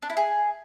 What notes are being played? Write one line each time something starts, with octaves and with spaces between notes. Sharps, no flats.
D4
E4
G#4